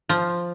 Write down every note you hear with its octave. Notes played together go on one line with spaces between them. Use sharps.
F3